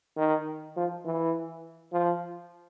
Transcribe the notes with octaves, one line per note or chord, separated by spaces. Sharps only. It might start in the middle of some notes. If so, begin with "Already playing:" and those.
D#3
F3
E3
F3